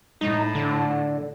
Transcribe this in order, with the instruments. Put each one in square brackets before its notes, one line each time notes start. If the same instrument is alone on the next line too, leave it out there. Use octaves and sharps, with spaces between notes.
[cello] A2 [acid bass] D#4
[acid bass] D3